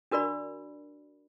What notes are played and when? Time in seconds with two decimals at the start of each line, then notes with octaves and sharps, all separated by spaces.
0.11 D4 F#4 A#4 D5 B5